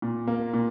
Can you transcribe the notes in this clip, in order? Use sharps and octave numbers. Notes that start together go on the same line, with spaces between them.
A#2
A#3
A#2